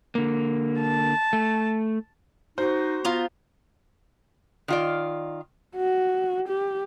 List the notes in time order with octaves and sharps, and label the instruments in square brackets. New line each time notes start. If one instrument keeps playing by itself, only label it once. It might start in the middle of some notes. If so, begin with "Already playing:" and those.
[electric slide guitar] D3 A#3
[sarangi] A5
[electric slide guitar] A3
[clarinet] D#4 [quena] F#4 [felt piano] C5
[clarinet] B3 [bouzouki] F4 A#5
[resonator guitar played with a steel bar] D#3 F4 D5
[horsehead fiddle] F#4
G4